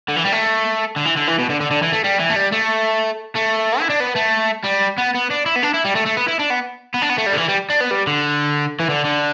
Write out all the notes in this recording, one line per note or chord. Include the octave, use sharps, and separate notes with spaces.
D3
E3
G3
A3
D3
E3
D3
E3
B2
D3
D3
D3
E3
A3
G3
E3
A3
G3
A3
A3
E4
D4
B3
A3
G3
B3
B3
D4
E4
B3
D4
E4
G3
A3
A3
B3
E4
D4
B3
B3
D4
B3
A3
G3
D3
E3
G3
D4
B3
G3
D3
E3
D3
D3